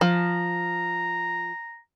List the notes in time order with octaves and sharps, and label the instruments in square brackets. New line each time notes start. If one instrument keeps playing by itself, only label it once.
[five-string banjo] F3 [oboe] A#5